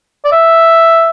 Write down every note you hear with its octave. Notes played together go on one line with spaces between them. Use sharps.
D5
E5